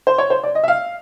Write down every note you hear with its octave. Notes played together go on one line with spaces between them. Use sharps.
C5
C#5
C5
D5
D#5
E5
F5